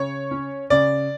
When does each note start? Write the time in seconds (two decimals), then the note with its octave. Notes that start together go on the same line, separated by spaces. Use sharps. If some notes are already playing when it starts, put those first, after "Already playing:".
Already playing: C#3 C#5
0.31 C#4
0.70 C#3 D5